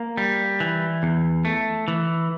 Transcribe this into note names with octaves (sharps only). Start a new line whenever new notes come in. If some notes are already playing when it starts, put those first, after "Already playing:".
Already playing: A#3
G3
E3
E2
A3
E3